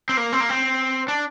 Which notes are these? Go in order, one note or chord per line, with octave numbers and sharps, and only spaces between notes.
C4
A#3
C4
A#3
C4
D4